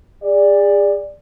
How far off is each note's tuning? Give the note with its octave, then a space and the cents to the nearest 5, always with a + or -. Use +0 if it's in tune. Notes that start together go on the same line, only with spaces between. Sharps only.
G#4 -35 D5 +0